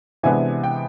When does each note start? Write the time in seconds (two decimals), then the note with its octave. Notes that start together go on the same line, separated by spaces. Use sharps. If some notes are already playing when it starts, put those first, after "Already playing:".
0.23 C3 E3 G#3 B3 D4 G#5
0.64 G5